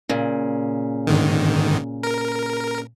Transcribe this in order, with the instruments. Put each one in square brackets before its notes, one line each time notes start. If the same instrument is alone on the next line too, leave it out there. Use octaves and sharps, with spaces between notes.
[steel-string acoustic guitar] A#2 C#3
[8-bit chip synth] G#2 D3 D#3
A#4